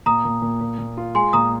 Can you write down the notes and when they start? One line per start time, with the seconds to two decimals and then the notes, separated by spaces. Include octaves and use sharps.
0.06 A#2 A#5 D#6
0.25 A#2
0.42 A#2
0.61 A#2
0.79 A#2
0.97 F4
1.15 G#3 G#5 C6
1.33 A#2 A#5 D#6